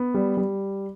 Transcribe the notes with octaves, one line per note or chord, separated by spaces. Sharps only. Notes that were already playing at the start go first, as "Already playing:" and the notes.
Already playing: B3
G3
G3